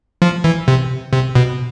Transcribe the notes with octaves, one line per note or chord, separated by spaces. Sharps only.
F3
E3
C3
C3
B2